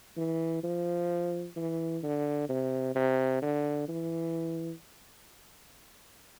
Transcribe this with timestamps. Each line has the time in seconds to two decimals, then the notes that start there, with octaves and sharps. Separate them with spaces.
0.17 E3
0.63 F3
1.56 E3
2.03 D3
2.49 C3
2.95 C3
3.42 D3
3.88 E3